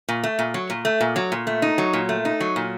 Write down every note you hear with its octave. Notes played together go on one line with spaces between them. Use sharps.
A#2
A3
A#2
F#3
A#2
A3
A#2
F#3
A#2
A3
D#4
F#3
A#2
A3
D#4
F#3
A#2